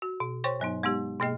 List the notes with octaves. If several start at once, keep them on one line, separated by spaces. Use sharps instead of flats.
F#4
B2
C5 C#5 G5 C6 C#6
G2 F#3 B3 D#4
G#3 B3 D#4 G4
B2 A#3 G#4 D#5 G5